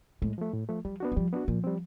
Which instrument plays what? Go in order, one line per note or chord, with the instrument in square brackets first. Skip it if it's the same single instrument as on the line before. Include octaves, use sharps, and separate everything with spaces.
[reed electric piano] A2 [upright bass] G#3
[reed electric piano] F3 A3
A2
F3 A3
[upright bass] F3 [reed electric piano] G3
[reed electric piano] B3 D4 F#4
[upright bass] F#3
[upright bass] F3 [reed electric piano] G3
[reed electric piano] B3 D4 F#4
[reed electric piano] A#2 [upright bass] F3
[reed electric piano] G3 C4